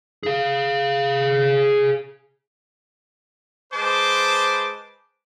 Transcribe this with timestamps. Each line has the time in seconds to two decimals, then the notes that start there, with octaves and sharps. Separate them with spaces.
0.23 G#4 F5
3.72 G#3 B4 C5 A5 D6